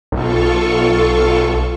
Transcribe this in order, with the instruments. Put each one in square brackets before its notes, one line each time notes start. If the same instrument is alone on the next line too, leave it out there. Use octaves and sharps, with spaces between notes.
[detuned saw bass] B1 [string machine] F4 A4 C#6